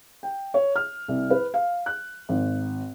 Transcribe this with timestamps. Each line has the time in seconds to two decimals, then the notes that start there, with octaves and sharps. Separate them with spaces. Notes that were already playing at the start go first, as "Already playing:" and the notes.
0.23 G5
0.54 C#5
0.76 F6
1.08 C2
1.30 B4
1.54 F5
1.86 F#6
2.29 G#1